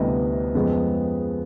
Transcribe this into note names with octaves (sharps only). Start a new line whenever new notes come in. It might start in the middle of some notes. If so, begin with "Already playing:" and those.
Already playing: D2 C3 E3 G3 B3 D#5
F2 C#3 F3 G#3 B3